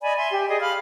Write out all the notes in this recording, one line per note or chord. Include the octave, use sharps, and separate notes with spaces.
D5 D#5 G#5 B5
E5 G#5 C6
G4
G#4 D5 D#5
F5 B5 F6